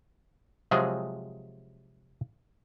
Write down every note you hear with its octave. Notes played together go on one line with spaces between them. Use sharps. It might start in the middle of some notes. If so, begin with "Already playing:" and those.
C3 F3 F#3 G#3 G#4